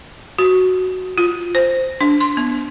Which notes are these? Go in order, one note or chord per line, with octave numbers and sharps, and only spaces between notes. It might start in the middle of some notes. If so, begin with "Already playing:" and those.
F#4
F4
C5
D4
C6
B3